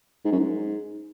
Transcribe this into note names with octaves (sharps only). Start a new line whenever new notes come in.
G#2
F#2
G#2